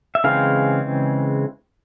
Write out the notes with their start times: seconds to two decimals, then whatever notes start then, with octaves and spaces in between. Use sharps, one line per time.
0.15 E5
0.24 C#3 E3 G#3 C4 F5